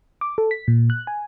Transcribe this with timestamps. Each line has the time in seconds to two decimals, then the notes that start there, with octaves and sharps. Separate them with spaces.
0.21 D6
0.38 A4
0.51 B6
0.68 A#2
0.90 F#6
1.07 G#5